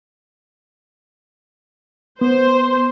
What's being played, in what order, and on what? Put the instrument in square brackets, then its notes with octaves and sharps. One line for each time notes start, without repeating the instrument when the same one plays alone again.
[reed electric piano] B3 [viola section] C5